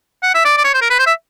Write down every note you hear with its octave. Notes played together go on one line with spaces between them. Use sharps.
F#5
E5
D5
D5
C#5
C5
A#4
B4
C5
E5